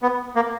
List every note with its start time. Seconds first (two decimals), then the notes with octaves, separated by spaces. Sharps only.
0.02 B3
0.36 A#3